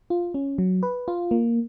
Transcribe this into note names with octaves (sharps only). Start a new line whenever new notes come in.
F4
C#4
F#3
B4
F4
A#3